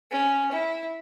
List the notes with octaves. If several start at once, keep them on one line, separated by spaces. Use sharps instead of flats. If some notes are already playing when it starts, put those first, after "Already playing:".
C#4
E4